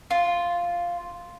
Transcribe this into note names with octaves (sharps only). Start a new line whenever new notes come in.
F4